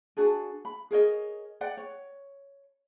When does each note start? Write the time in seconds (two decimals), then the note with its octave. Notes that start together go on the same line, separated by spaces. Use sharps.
0.17 D4 F#4 G#4 A4
0.65 B5
0.91 G#4 A#4 C#5 D#5
1.61 D5 F#5 G5
1.77 C#5